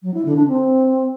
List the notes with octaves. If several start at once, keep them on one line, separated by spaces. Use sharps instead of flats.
F#3
E4
D3
D4
C4